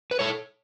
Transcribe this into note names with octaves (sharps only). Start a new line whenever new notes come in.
B4
A4 C#5